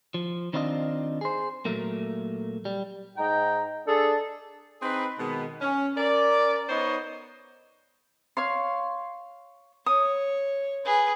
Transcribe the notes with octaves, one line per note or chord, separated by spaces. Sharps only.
F3
D#3 C4 D4 E4 F4 D#5
G#4 C5
A#2 F#3 A3 A#3
G3
G#2 D#4 G5 A#5
D4 G#4 A4
C4 D#4 G#4 B4
B2 D#3 G#3 B3
C#4
C#4 A#4 D5
B3 D#4 C5 C#5 D#5
C#5 F5 C6
C#5 D#6
G#4 B4